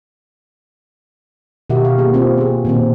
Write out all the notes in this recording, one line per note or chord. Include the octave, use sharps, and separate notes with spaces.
B2 D#3 F#4 G4 E5
F5
A#3 G4 G#4
C4 F4 F#4
B3 G#4
A#2 D#3 C4